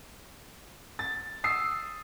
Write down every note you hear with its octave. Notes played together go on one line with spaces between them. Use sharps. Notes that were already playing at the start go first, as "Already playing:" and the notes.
A6
D#6 E6 C7